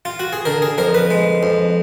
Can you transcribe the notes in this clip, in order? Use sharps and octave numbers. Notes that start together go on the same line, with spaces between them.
F4
F#4
G#4
D3 A#4
G#4
F2 A#4
B4
G#3
F2